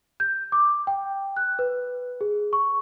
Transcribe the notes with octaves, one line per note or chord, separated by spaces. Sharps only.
G6
D6
G5
F#6
B4
G#4
C#6